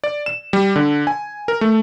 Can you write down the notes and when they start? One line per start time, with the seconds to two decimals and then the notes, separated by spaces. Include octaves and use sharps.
0.04 D5
0.26 E7
0.53 G3
0.76 D3
1.07 G#5
1.48 A#4
1.61 A3